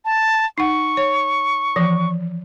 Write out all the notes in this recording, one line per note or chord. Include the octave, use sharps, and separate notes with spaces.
A5
D#4 F#5 C#6
C#5
E3 F3